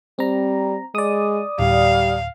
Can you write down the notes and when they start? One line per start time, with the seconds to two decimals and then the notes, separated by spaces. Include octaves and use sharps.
0.19 G3 C4 A#5
0.95 G#3 D5 D#6
1.59 D1 G3 F5